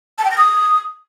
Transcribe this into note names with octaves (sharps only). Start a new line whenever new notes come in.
A5
G5
A#6
D#6